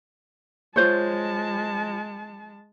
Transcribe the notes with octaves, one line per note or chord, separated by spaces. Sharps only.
G#3 F4 C5 C#5 A5